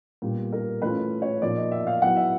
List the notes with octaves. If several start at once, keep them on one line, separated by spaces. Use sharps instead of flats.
A#2 G3 B3
A#4
E3 A3 C#4 F4 B4
C#5
A#2 F3 A#3 D#4 D5
D#5
E5
F5
F#3 B3 E4 F#5
E5